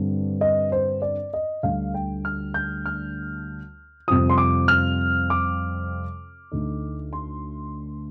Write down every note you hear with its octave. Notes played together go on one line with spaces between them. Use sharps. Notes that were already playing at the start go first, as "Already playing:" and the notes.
Already playing: G2 D3 G3 C4
D#5
C5
D5
D#5
D2 D3 G3 F5
G5
F6
G6
F6
F2 C3 G3 C4 F4 D#6
C6
D6
F6
D6
D2 D3 A3 D#4
C6